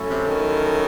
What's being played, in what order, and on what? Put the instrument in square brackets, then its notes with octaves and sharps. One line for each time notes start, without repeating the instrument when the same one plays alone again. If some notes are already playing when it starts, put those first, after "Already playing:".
Already playing: [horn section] F#3 A3 C#4 E4 A4
[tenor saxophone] C3
D#3